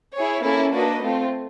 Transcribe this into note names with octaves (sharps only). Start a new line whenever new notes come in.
E4 G#4 C#5
A#3 C#4 E4 A4
A#3 D4 F#4 B4 D#5
A3 C4 F4